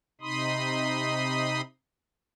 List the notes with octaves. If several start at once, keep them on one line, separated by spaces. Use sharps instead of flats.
C3 D#4 B5 C6 D#6